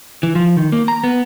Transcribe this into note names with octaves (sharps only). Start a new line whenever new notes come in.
E3
F3
D#3
A#3
A#5
B3